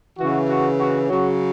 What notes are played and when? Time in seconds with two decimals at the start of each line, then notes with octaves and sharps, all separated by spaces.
0.18 C#3 E3 F#4
0.49 F#4
0.79 F#4
1.09 C#3 F#3 F#4